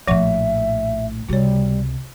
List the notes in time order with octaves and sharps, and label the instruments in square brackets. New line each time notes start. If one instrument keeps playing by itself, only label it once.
[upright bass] A#1 A2 [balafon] F3 F#5 C#6 [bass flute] E5
[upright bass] C#2 C3 [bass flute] G3 [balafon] F#4 C#5